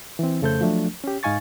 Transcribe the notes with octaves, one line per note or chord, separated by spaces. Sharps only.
E3 C4
F2 C#3 A3 A4 C5 G6
F3 F#3 A3 D4
C#4 G4
G#2 D#4 F5 G#5 C#6 A6